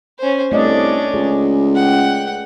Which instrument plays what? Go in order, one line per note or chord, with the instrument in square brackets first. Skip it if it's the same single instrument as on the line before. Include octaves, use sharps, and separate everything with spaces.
[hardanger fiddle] C#4 C5
[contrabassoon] C2 [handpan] A3 D5 D#5 [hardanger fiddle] C#4 D4
[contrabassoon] C#2 [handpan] G#4
[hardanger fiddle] F#5 G5